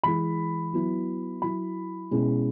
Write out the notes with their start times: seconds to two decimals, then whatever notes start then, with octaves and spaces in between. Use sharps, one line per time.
0.03 E3 G#3 E4 B5
0.73 F#3 B3 E4
1.42 F#3 E4 B5
2.11 B2 G#3 C#4 E4